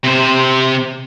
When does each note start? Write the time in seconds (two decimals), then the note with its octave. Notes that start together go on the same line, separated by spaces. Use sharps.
0.04 C3 C5